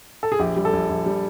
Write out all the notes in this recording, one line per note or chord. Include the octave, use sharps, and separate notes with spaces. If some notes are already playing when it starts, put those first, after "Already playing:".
A4
G#4
A#1 G4
G3
A4
A#1
A#1
G3